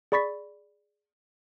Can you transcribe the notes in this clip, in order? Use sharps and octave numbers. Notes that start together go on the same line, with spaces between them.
G#4 D5 B5 C#6 A6 B6